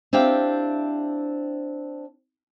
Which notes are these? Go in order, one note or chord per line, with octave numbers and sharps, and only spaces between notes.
C4 D4 E4 G4 F5 G5